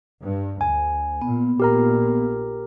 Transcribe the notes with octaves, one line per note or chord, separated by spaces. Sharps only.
G2
D2 G#5
A#2 B3
A#1 A#2 G4 A#4 A#5